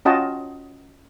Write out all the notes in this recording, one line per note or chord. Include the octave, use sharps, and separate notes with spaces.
C#4 F4 F#4 D#5 G5 A5